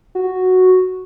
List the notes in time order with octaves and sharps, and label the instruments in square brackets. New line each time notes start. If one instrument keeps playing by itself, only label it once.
[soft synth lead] F#4